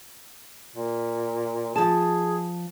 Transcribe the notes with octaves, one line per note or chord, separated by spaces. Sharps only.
A#2
F3 G#4 A5